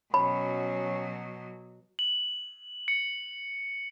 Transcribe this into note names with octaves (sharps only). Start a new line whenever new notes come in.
B2 F#3 C#4 B5
F#7
C#7